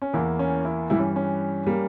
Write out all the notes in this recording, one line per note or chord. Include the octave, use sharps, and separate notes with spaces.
C#4
E2 E3 A#3 E4
C#4
E4
G2 E3 G3 E4
C#4
C#4
G3 A#3